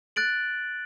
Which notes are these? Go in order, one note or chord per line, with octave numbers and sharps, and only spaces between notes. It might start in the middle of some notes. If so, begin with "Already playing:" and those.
F#6 A6 D7 F#7